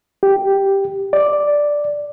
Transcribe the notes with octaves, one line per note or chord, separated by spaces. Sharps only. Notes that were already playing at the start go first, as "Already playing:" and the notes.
G4
D5